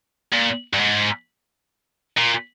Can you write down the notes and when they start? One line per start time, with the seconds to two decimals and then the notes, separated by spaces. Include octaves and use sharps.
0.33 A#2
0.73 G2
0.79 G#2
2.18 A#2